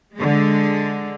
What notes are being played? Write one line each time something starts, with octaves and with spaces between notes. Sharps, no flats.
D3 G#3